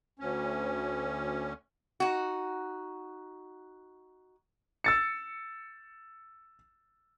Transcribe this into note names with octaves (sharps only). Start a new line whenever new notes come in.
D2 C#4
D#4 F#4
E6 A6 C#7